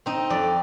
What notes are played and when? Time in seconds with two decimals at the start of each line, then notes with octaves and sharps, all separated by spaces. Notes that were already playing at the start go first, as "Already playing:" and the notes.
0.06 C4 D#4
0.30 F2 D5